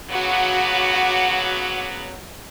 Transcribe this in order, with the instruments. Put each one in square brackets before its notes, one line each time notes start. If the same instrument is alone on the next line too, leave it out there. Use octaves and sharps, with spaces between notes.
[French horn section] C#3 F#3 B3 [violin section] F#4 D6